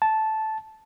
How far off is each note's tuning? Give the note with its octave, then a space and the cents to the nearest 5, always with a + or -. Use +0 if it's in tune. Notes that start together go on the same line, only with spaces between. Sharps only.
A5 -10